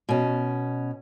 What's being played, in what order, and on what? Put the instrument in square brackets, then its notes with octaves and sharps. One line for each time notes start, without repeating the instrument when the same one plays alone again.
[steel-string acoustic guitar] B2 C#4